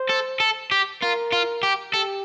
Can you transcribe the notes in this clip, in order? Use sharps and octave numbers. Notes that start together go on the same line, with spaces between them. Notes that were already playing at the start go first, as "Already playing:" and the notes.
Already playing: C5
A4
A4
G4
F4 A#4
F4
G4
G4 A4